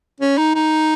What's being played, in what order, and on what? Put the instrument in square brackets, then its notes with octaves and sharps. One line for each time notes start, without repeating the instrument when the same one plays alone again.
[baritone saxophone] C#4
D#4
D#4